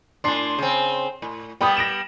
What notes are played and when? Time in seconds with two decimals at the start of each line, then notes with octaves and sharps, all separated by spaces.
0.24 A2 D4 C6 C7
0.58 C#3 C4
1.22 A2
1.61 G3 B3 G5 B5 D#6
1.77 A#6 D7 E7